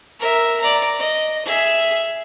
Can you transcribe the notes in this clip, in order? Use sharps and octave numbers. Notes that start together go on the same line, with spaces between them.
A#4 E5
D5 A#5
D#5
G#4 E5